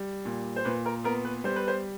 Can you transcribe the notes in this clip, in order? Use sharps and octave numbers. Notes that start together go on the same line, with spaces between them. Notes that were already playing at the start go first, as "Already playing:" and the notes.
Already playing: G3
A#2
C5
A#2 B4
A#4
B3 A#4
B4
G3 C5
B4
C5